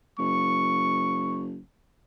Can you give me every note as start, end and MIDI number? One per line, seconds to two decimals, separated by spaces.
0.19 1.59 30
0.19 1.43 85